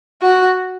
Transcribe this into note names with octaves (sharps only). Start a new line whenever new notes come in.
F#4